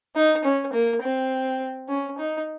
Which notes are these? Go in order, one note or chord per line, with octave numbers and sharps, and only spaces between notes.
D#4
C#4
A#3
C4
C#4
D#4